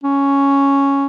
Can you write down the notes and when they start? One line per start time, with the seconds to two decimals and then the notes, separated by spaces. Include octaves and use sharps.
0.04 C#4